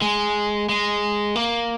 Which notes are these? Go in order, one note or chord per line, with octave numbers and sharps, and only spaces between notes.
G#3
G#3
A#3